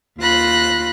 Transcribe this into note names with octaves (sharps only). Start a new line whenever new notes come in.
D#2 F4 B5 F#6 A#6